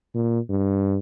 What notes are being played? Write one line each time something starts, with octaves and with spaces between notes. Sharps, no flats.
A#2
G2